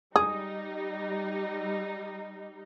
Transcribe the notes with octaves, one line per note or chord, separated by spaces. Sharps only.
G3 D#4 G#4 D#6